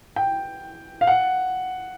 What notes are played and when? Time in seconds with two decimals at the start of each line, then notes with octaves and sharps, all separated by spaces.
0.16 G5
1.01 F5
1.07 F#5